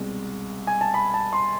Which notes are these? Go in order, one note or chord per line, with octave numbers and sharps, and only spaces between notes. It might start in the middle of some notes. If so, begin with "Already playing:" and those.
Already playing: C2 B2 G#3 C4
G#5
A5
B5
A5
C6